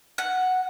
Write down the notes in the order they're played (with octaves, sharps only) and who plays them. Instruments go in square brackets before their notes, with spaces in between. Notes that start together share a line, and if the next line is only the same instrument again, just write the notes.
[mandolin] F#5